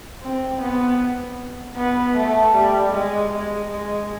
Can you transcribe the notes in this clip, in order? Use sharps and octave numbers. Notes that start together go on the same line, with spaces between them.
C4
B3
B3
A3
G3
G#3
G#3
G#3